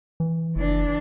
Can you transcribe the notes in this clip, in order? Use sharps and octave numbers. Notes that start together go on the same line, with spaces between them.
E3
F#1 E3 D4